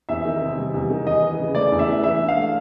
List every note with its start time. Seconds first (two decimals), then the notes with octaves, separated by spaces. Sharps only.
0.09 E2 E5
0.25 D#3
0.41 C3
0.57 G3
0.74 E2
0.90 D#3
1.07 E2 D#5
1.23 E3
1.39 C#3
1.55 A3 D5
1.72 E2
1.79 E5
1.88 E3
2.03 E3 E5
2.20 D4
2.28 F5
2.37 A3